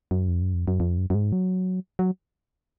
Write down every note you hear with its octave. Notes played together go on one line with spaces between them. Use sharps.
F#2
F2
F#2
F2
F#2
F2
F#2
F#2
G#2
F#3
F#3